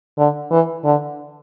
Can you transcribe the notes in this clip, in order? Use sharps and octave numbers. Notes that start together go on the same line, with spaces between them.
D3
E3
D3